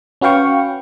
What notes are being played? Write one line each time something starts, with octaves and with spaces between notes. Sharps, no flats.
C#4 F#4 B4 F5 G5 C#6